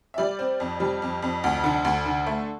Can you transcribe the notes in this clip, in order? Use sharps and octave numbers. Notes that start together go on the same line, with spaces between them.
E5
G3 D5
C4
F2
G3
F2
F2
D2
D3
D2
D3
A3